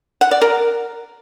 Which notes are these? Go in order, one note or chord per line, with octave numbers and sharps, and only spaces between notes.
F#5
D5
A#4